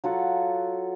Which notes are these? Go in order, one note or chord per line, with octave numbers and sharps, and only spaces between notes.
F#3 F4 A4 F#5